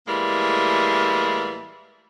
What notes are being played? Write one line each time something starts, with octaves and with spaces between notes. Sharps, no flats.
A2 E3 G3 G#3 A#3